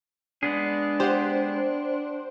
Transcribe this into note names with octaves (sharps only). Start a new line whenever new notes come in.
G#3 B3 D4 G#4
G4 C5 F#5